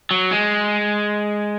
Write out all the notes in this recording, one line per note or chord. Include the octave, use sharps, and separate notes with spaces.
F#3
G#3